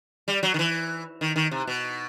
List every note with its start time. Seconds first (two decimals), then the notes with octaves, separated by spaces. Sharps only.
0.28 G3
0.43 F#3
0.54 D#3
0.59 E3
1.21 D#3
1.36 D#3
1.51 C3
1.67 B2